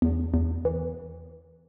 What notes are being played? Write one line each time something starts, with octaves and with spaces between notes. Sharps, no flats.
E2
E2
E3